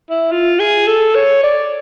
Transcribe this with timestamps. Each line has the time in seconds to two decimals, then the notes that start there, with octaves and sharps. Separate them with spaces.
0.10 E4
0.32 F4
0.60 G#4
0.87 A4
1.15 C#5
1.44 D5